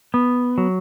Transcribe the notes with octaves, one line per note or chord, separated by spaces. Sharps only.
B3
F#3